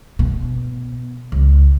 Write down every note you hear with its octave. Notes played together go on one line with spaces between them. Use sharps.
B2
C#2